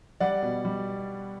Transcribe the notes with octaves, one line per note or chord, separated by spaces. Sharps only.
G3 D5 F#5
B2
G3